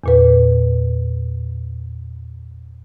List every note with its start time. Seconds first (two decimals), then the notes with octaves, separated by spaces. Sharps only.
0.04 E2 A#2 B4